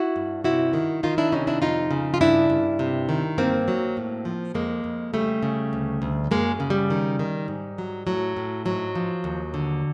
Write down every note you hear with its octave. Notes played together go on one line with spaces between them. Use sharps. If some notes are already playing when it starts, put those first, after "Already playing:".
Already playing: E4 F#4
G2
C3 E4 F#4
D#3
D#3 D#4 F4
D4 E4
C3 C#4 D#4
D4 E4
F2 D#4 F4
C#3
F4
G2 D4 E4
G2
C3
D#3
G2 A#3 C4
F#3
A2
F3
F2 G#3 A#3
F2
C#3 G3 A3
C#3
D2
D2
F#2 G#3 A#3
C#3
G3
D#3
D#3
G#2
F#3
A2 F#3
A2
G#2 F#3
F3
D#2
D3